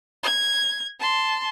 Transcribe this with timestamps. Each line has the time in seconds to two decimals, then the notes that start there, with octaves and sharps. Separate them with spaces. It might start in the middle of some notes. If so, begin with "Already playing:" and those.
0.23 G#6
1.00 A5 C6